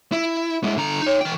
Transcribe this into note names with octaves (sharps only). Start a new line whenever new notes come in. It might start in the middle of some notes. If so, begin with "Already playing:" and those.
E4
G#3 E4
D3 A#5
D#4 C#5
E3 G5